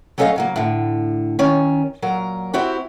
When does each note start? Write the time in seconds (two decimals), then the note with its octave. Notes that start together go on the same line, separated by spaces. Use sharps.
0.18 F#3 A3 C#4 A4 D#5 F5
0.36 C#3 F#3 A#3
0.56 A2 D3
1.39 D#3 C#4
2.02 A#2 F#3 A#4
2.53 C4 E4 F#4 G4